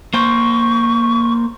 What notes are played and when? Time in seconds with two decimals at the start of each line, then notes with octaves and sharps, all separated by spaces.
0.14 A#3 C5 C#6